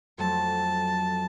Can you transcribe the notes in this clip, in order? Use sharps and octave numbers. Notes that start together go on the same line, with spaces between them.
F2 F#3 A3 A5